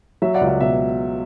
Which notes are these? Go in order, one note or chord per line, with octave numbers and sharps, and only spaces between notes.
F#3 E5
D5 F#5
C#2
D5 F#5
B2 E5